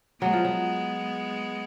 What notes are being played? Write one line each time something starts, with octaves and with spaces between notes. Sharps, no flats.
F#3 G#3 B3
F3
F#3